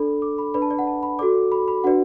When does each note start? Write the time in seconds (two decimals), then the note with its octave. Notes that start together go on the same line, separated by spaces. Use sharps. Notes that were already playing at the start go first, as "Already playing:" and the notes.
Already playing: D4 A4 D5 B5
0.22 D6
0.38 B5
0.54 D4 B4 D5 B5
0.62 A5
0.71 D5
0.79 F#5
0.87 A5
1.03 B5
1.19 F#4 A4 D5 D6
1.52 B5
1.68 B5
1.84 D4 F#4 B4 D5 F#5